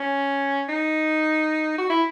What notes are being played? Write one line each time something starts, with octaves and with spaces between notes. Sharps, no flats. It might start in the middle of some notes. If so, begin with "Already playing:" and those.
Already playing: C#4
D#4
F#4
E4